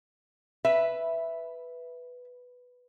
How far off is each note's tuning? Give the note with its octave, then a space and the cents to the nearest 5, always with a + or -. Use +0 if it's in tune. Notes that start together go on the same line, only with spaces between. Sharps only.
B4 +0 E5 +0